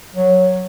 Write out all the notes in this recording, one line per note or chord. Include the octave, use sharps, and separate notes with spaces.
F#3